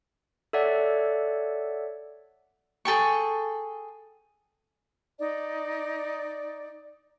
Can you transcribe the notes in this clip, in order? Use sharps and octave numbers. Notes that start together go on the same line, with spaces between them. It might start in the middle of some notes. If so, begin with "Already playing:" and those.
A4 C#5 D5 E5 F#5
G#4 A4 G5 C#6
D#4 D5